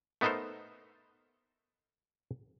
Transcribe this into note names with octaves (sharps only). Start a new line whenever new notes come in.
A3 B3 D#4 A4 A#4 C5